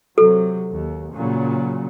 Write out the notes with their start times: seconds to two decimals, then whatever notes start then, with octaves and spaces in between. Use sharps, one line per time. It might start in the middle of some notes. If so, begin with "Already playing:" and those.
0.18 C3 F#3 A4
0.73 D#2
1.12 A#2 C#3 F#3